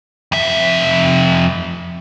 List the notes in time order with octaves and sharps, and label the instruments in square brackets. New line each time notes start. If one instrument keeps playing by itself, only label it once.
[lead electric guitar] F2 E5